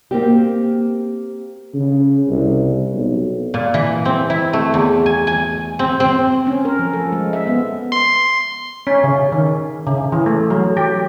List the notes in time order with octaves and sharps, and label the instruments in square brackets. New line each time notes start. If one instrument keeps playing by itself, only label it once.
[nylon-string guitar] A#3 C4 G4
[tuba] C#3
C2
B1
[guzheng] A#2
E3
C4
E4
A3
E2
G#5
G#5
C4
C4
[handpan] C#4
A#4
F3
A4
G#3
E5
B3
[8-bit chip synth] C6
[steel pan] C#4
C#3
D#3
C#3
E3
A3
F#3
G4